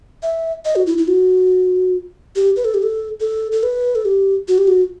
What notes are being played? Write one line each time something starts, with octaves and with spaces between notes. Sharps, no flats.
E5
D#5
F#4
E4
E4
F#4
G4
B4
A4
G4
A4
A4
A4
B4
A4
G4
F#4
G4
F#4